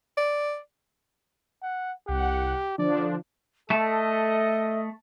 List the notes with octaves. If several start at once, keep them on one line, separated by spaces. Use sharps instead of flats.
D5
F#5
C2 G4 F#5
D3 F3 D4 D5
A3 A4 D#5 E5 A5